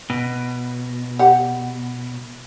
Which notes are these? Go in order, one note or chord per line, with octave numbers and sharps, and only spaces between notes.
B2
G4 F#5